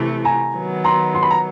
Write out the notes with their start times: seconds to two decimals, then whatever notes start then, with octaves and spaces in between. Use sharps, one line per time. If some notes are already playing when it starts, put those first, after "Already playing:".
Already playing: C3 E3 A3
0.25 G#5 A#5
0.55 D#3 F#3 B3
0.84 A#5 C6
1.15 C6
1.23 B5
1.30 A#5